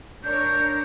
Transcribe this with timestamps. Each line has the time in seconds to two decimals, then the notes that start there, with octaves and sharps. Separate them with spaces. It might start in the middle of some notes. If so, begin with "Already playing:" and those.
0.24 D4 A#4 C#5 G6